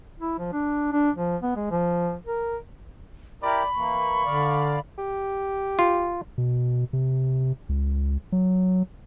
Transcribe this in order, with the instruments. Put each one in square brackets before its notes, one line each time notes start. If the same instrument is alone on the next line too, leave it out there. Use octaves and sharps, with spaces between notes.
[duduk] E4
F3
D4
D4
F3
B3
G#3
F3
A#4
[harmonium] E4 G4 A#4 [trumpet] D5 [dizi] B5
[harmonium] E3 A#3 [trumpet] C#6
[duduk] D3 [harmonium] D5 F5
[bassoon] G4
[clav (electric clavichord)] F4
[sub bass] B2
C3
C#2
F#3